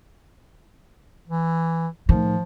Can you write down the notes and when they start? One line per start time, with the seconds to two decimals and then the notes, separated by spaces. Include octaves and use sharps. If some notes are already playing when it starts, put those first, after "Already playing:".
1.28 E3
2.09 A2 D#3 F3